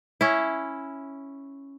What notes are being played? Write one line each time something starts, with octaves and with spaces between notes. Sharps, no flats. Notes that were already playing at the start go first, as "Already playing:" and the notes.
C#4 E4